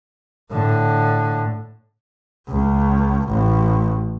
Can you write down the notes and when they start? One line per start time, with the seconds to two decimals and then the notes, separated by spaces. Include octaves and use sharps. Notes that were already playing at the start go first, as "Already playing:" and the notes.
0.51 A2 D3
2.48 C#2
3.29 A1